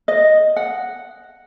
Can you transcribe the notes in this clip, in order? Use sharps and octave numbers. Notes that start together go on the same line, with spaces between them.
D#5
F#5